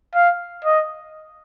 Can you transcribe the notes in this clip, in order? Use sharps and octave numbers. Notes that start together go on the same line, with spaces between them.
F5
D#5